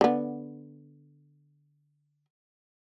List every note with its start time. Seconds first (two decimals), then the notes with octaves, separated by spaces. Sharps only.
0.01 D3 B3